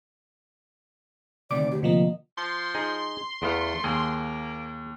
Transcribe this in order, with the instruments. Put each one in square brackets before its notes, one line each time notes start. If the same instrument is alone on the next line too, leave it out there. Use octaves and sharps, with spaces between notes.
[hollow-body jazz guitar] D2 C3 D#3 [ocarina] D5 [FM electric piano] D6
[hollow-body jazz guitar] D2 [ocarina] G4
[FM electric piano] C3 F3 A#3 [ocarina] D#5
[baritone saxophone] F3 [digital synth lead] C6
[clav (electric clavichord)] D#4 G#4
[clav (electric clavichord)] E2 B3 F5 [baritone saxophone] A3
[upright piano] D#2 [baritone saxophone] A#3 [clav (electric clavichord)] G#4